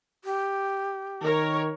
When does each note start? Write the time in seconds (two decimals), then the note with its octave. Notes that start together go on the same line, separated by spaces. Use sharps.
0.24 G4
1.22 D#3 A#4 C#5